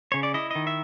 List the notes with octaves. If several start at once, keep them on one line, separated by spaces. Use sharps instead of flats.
C#3 C#5
D5
E4 D#5
D#3 D#5
E5